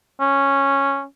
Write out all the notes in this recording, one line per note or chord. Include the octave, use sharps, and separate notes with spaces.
C#4